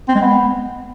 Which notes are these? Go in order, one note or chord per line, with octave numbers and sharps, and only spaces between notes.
C4
G#3
B3